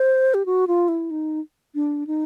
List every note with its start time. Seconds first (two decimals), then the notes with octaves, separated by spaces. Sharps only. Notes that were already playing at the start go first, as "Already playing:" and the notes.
Already playing: C5
0.34 G4
0.46 F#4
0.68 F4
0.88 E4
1.11 D#4
1.75 D4
2.07 D#4